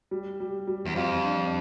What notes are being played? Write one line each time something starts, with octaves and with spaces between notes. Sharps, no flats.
G3
G3
G3
E2
F2 F4
D4